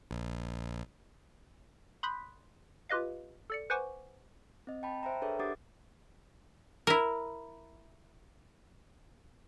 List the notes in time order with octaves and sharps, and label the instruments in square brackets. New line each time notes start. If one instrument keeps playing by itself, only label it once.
[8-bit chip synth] A#1
[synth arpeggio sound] B5 C6 D#6 F#6 G6 B6
F4 G4 B4 D#5 F5
A4 D5 C#7
B4 C5 F#5 G#5 C#6 D6
[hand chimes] C4 D#5
G5 A5 B5
C5 E5 G5 A#5
D4 G#4 A4 B4 C#5 E5
D4 G4 F#5 D6 D#6 A6
[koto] E4 A#4